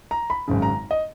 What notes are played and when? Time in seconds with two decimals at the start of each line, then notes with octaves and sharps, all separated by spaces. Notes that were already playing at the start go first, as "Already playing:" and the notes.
0.11 A#5
0.30 B5
0.48 G#1 F#2 C#3
0.62 A#5
0.91 D#5